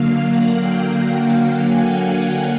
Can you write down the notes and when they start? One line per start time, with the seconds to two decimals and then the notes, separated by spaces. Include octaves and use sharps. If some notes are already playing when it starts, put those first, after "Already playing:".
Already playing: D3 F#3 A#3 F5
0.24 F#5
0.59 G5
1.62 G#5